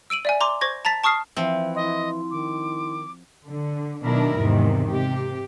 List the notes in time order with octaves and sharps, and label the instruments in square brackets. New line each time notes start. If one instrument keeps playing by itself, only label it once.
[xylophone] E6 D7 D#7 F#7
D5 E5 G#5
A#5 C6 D6
C5 C#6 G#6 A#6
A5 A#5 A6 B6
A5 C#6 D#6 F6 C7
[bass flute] E3 [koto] F3 C4 [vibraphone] E5
[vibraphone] E4 C6 [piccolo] D#5
[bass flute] D#3 [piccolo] D6
[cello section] D3
B2 D#3 F#3 D4 E4 A#4
E2 G#2 C3 D#3
C3 G4